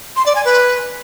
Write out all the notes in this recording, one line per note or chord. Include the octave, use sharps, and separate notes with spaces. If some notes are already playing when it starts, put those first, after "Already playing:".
C6
D5
G#5
B4